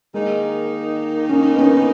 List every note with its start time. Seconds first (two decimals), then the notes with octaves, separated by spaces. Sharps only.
0.14 D#3 G#3 A#3 D#4
1.29 C#4
1.54 B3
1.58 C#4